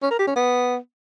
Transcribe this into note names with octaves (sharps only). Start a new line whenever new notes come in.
C#4
A#4
G4
C#4
B3